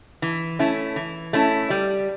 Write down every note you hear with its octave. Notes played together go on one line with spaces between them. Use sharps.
E3
A3 C#4 E4
E3
A3 C#4 E4
G3